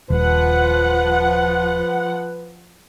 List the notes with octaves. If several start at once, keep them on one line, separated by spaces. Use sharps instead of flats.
D#1 F3 B4 F#5